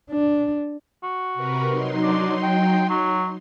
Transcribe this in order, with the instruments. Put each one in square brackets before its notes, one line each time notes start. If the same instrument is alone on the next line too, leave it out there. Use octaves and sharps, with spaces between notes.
[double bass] D4
[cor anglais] F#4
[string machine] C3 A#4 B4
F#3 D#4 C6
[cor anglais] D4
G5
F#3